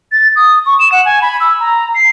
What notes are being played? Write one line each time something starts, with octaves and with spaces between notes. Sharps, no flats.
A6
D#6
C#6
E7
F#5
G#5
B5
E6
A#5
C7